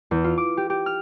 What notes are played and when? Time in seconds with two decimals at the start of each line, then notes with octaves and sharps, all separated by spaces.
0.11 E2
0.24 F4
0.38 D6
0.57 G4
0.70 G4
0.86 F6